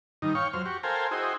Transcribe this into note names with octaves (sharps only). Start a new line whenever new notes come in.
G2 D#3 D#4
C#5 F5 G5 C#6
F2 F#3 C5 F6
F#4 G4 C#6
A4 A#4 C5 F5 G5 G#5
E4 F#4 G#4 C5 D#5 G5